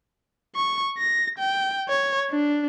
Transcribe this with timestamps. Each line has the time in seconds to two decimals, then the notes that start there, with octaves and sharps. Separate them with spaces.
0.56 C#6
0.98 A#6
1.39 G5
1.89 C#5
2.31 D4